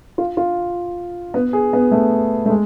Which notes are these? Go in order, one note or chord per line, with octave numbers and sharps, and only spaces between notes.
F4
F4
B3
G#4
B3
A3
A3
G#3